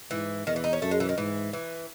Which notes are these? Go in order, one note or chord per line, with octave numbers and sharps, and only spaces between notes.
G#2 E3
E2 D#3
E3
D#4
C#4
F#2 A3
G#3
E3
D#3
G#2 E3
E3